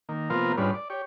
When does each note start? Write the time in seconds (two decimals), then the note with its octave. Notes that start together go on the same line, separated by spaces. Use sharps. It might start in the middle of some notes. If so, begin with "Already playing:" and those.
0.09 D#3 A#3
0.30 C3 F3 A#3 B3 F4 A#4
0.57 G#2 G3 C#4 D4 F4 B4
0.74 D5
0.90 G4 C#5